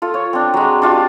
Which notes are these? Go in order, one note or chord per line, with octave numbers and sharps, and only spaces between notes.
F4 A4
C#5
C4 D4
F#3 G#3
D4 F4 G4